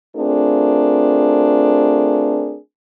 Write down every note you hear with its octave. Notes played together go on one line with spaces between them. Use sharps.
A3 C4 D4 F4 G#4 A#4